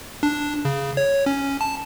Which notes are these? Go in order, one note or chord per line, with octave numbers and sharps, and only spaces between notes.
D4
C#3
C#5
C#4
A5